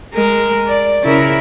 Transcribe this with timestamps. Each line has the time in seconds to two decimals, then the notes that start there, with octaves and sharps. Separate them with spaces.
0.14 G#3 A#4
0.68 D5
1.03 C#3 E4 A#4